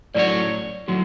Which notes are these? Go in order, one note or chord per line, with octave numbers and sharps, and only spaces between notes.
A2 F#3 C#4 F#4 B4 C#5 D5
A2 F#3 F#4